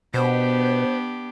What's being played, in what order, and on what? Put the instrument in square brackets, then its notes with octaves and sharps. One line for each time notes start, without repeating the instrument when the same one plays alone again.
[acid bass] B2 [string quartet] B3 D4 G4 [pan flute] C5